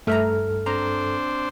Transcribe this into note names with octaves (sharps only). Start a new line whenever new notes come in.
G2 A3 A4 E5 A#5 F6
C4 D4 C5 A#5